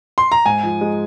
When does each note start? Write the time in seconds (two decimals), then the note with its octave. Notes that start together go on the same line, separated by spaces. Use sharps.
0.18 C6
0.32 A#5
0.46 G#2 G#5
0.63 F3
0.81 G#3